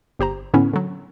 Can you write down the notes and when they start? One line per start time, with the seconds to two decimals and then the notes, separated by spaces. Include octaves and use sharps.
0.19 G1 G4 C5 A#5
0.54 A2 D3 B3 C#4 E4
0.73 D3 F#3